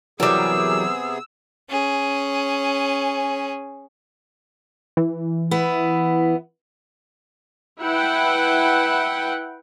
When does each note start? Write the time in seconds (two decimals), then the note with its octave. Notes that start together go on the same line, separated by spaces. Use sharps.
0.20 C3 E3 F#3 G3 B3 G#4 A#4 E6
1.70 C#4 G#4
4.97 E3
5.51 B3 E4
7.81 E4 B4 F#5 G5